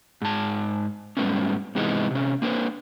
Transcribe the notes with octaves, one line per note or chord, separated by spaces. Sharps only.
G#2 A5
G#2 C3 G3 A3 B3 C#4
G#2 C3 E3 G#3 B3 D#4
C3 C#4
A#3 D4 B4 C5